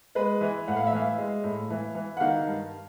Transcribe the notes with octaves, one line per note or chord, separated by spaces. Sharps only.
G#3 B4
E3
A2 F#5
F5
E5
E3 F5
G#3
A2
E3
E3
F#5
D#3 F5
G2